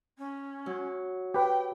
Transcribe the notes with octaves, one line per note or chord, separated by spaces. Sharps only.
C#4
F#3
G4 B4 G5